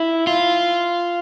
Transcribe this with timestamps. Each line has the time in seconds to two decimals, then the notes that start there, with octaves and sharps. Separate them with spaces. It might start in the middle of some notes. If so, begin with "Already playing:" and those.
Already playing: E4
0.27 F4